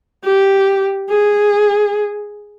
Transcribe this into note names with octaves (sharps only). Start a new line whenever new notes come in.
G4
G#4